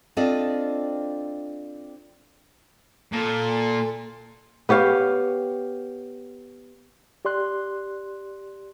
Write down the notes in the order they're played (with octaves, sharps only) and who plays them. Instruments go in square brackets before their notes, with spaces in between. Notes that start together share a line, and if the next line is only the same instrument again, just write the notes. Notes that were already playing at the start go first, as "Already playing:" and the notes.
[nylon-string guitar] C4 D4 F4 A4 D5 D#5
[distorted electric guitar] A#2 [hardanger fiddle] A4
[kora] B3 G4 C#5 F5
[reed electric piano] G4 D5 C6 F#6